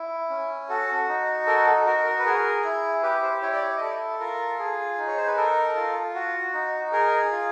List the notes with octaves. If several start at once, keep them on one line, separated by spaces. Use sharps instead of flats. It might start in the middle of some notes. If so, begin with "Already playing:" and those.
Already playing: E4
C#4
F#4 A4
D#4
A4 A#4
A4
F#4 A#4
A#4
B4
G#4 A#4
E4
G4 B4
C5
E4 C#5
D5
C#5
D#5
A4 D5
F4 A#4
G#4
D#4
C#5
C5
B4
A4 A#4
F4
F#4
D#4
G#4 A#4
F4